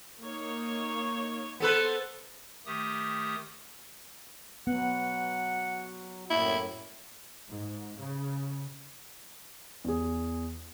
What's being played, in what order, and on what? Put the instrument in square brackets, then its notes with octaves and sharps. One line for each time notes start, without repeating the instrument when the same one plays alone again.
[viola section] A#3 D#4 C#5
[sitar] B3 A4 B4 [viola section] C5
[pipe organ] D#3 A3 G4 D#6
[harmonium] F#3 [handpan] B3 [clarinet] F#5
[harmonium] F#2 A2 [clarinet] A#3 [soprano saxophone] E4
[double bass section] G#2
C#3
[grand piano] E2 G#4